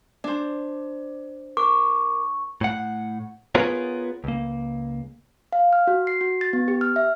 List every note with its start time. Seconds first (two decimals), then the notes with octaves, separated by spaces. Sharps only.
0.24 D4 C5 D5
1.57 A#4 C#6 D6
2.61 A2 F#5
3.55 B3 F4 G#4 A#4 B4 C#5
4.24 C#2 A#3
5.52 F5
5.73 F6
5.87 F#4
6.07 C7
6.21 F#4
6.41 A6
6.53 B3
6.68 G4
6.81 F6
6.96 E5